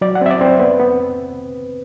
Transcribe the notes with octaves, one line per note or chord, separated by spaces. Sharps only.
F#3 D5
F#5
C4 E5
D5
C4 C5
B3 B4
B3